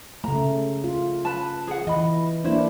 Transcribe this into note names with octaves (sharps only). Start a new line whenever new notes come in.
C#3 A3 A#5
F4
B4 A5
G#4 F#5
E3 D#5 B5
A#3 D4 E4 C5